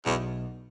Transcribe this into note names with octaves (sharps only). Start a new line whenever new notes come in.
B1 E2 B2 F#3